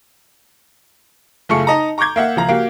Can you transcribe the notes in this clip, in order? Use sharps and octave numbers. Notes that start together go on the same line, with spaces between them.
F#1 A3 F4 G#4 C#6 C#7
D#4 D#5 A5 A#5
A#5 C#6 D6 G6 G#6
A#3 E5 F#5
C#2 F3 A#5
A#3 F#4 G4